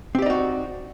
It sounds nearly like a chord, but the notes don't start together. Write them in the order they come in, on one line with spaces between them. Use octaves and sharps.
C4 G4 D5 D#4 F#4